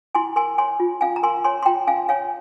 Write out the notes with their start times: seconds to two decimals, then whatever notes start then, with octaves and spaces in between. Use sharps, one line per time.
0.15 E4 G#5 C6
0.36 A#4 G#5 C6
0.58 C#5 G#5 C6
0.80 F4
1.01 C#4 F5 G#5
1.16 A#5
1.23 A#4 G#5 C6
1.44 C#5 G#5 C6
1.63 C6
1.65 F4 G5 A#5
1.87 C#4 F5 G#5
2.09 C#5 F5 G#5